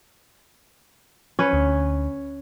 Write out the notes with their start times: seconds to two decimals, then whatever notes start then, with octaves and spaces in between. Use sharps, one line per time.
1.39 C#4 B4 C#5
1.53 D2